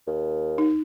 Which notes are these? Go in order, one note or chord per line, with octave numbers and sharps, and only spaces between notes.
D#2
D#4